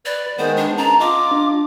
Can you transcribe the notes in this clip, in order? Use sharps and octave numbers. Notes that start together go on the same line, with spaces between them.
B4 D5
D#3 G#3 B3 C5
D4
C#4 A5 A#5
F4 D#5 D6
D4